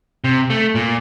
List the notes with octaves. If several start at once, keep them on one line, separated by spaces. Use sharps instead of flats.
C3
A3
A#2